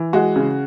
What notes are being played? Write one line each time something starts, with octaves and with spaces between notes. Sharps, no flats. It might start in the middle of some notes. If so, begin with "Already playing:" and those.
Already playing: E3
G#3 F#4
C#3